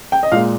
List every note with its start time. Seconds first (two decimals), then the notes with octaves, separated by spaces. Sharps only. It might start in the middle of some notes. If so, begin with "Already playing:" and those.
0.12 G5
0.23 D#5
0.32 A#2 G#3 F5